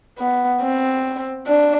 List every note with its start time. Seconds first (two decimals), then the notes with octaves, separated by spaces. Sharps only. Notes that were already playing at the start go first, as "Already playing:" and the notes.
0.19 B3
0.61 C4
1.47 D4